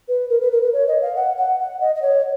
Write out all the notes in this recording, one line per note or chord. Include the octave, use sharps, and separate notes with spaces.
B4
A#4
B4
A#4
B4
C#5
D#5
F5
F#5
F#5
F#5
D#5
D#5
C#5